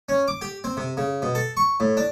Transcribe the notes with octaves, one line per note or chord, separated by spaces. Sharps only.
C#4
D6
G4
C4
C3
C#3
B2
A4
C#6
A2
D4